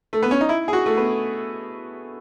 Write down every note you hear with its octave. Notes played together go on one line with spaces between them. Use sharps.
A3
B3
C#4
D#4
E4
G#4
F#4
A3
B3